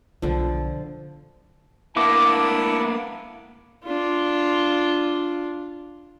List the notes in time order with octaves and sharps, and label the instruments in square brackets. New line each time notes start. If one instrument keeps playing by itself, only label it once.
[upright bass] B1 F4 [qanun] D3 F3
[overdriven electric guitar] A#3 B3 [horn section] D4 E4 A5 [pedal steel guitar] D6
[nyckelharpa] D4 F4